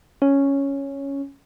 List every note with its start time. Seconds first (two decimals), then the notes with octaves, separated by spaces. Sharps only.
0.22 C#4